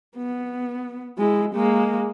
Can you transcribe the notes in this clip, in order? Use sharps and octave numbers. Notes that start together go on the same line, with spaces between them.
B3
G#3 E4
G#3 A#3